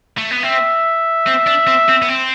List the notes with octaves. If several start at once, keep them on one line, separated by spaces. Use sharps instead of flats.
A3
B3
C4 E5
C4
D4
C4
C4
B3
C4